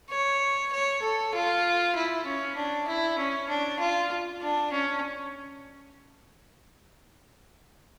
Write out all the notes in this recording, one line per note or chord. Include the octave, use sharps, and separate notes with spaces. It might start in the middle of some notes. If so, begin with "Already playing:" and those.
C#5
C#5
A4
F4
E4
C#4
D4
E4
C#4
D4
F4
D4
C#4